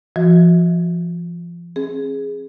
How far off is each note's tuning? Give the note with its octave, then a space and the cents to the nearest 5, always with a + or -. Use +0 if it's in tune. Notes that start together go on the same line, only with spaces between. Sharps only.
F3 -30 F#4 -15 D#5 +45
C4 +40 G#4 +0